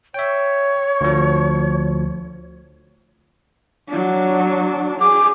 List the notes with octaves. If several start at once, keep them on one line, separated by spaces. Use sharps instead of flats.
C#5 E5 G5
D2 F3
F#3 D4
G#4 D6